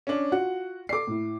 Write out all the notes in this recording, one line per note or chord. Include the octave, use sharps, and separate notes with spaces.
C#4 D4
F4 F#4 F#5
A4 D5 D6 C7
A2 E4